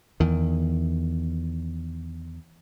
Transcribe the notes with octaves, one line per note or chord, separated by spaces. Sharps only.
E2 D#3